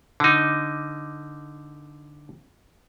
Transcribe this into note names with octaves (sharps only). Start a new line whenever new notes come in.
D3 D#4